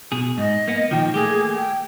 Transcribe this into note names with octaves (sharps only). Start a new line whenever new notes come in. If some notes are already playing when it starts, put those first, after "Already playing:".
B2 G#4
G#2 D#5
A#3 B3
A#2 D#3 F3 G5
A3 A#3 G4 G#4
G5